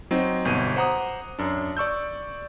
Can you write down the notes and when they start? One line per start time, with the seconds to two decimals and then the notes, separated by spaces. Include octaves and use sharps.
0.11 F#3 C4 D#4
0.45 G1 B2 D#7
0.76 C5 F#5 A#5 D6 D#6
1.39 F#2 D4
1.77 D5 C#6 E6 G6